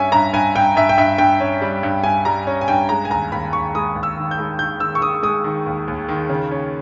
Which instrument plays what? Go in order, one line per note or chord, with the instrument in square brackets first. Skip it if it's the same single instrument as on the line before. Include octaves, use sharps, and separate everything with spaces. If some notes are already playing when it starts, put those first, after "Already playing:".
Already playing: [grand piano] G2 G3 C#4 E5 G#5
G2 A#5
G2 G#5
G2 G5
G2 E5
G5
G2 E5
G2 G5
C#4
G3
G2
G2 G#5
G3 A#5
C#4
G#5
G2 G5
G#3 A#5
G#5
D#2 A#5
D#2 B5
D#2 C#6
G#3 D#6
D#2
E6
D#3
G6
G#3
D#3 G6
D#3 E6
C#6
D#3 D#6
G#3 D#6
D#3
D#2
D#2
D#3
C#3
C#4